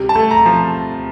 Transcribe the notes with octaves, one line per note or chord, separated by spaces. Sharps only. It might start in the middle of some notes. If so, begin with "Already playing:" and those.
Already playing: C3 G3
A5
A3
A#5
F3